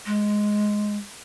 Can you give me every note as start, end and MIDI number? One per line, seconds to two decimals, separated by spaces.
0.06 0.97 56